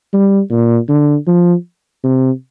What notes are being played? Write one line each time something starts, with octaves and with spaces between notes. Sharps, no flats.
G3
A#2
D3
F3
C3